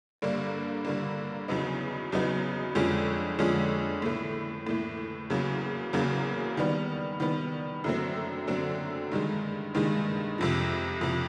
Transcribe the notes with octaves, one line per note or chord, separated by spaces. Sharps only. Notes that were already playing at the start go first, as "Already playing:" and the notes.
G2 D3 G3 A#3
G2 D3 G3 A#3
E2 C#3 F#3 B3 D#4
E2 C#3 F#3 B3 D#4
F2 D3 F3 G#3 C#4
F2 D3 F3 G#3 C#4
A2 E3 A3
A2 E3 A3
E2 C#3 F#3 A#3
E2 C#3 F#3 A#3
D#3 G3 B3
D#3 G3 B3
F#2 D3 F#3 A3 C4
F#2 D3 F#3 A3 C4
G2 D#3 G#3
G2 D#3 G#3
F2 C3 F3
F2 C3 F3